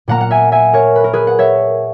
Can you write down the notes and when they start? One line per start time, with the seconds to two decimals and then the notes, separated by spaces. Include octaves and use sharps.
0.08 A#2 A#3 F#5 A#5
0.21 F#5
0.31 E5 G#5
0.52 E5 G#5
0.73 A#4 C#5
0.96 B4
1.04 A#4
1.13 G#4 B4
1.27 F#5
1.39 C#5 E5